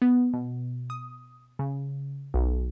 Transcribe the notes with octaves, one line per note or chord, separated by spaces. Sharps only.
B3
B2
D#6
C#3
B1